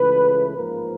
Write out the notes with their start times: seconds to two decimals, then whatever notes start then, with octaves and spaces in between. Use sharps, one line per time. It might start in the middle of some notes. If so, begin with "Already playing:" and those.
Already playing: C#2 C#3 E3 A3 B4
0.55 A1 G#2 F3 A#3 A#4